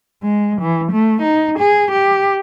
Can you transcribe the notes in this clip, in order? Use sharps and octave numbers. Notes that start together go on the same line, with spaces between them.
G#3
E3
A3
D#4
G#4
G4